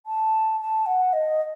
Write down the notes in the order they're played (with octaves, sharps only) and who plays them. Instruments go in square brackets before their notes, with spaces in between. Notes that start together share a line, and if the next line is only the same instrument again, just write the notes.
[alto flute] A5
A5
F#5
D#5